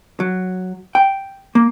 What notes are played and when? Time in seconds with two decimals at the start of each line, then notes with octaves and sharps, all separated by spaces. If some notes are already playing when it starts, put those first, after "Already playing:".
0.20 F#3
0.95 G5
1.55 A#3